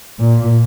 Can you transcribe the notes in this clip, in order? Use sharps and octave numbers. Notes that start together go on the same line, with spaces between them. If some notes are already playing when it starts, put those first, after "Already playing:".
A#2